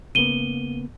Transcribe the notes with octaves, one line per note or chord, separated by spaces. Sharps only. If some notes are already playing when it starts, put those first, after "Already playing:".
C#3 A#3 B3 D#7 G7